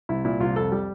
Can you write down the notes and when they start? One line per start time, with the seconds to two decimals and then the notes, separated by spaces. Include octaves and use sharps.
0.09 C2 E4
0.25 A#2 E4
0.40 C2 F4
0.56 F2 A4
0.72 G3